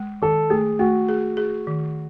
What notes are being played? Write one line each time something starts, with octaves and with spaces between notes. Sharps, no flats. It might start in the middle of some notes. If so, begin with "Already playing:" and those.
Already playing: G#3
D#3 A4
A3 G#4
A3 F#4
G#4
G#4
D#3